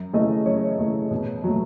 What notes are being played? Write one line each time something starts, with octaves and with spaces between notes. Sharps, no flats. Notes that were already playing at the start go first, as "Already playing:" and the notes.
Already playing: F#2
C#3 E3 A3 D#5
F#2 C#5
C#3 E3 A3
B2
F#3 A3